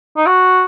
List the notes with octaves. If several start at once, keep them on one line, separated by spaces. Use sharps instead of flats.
D#4
F#4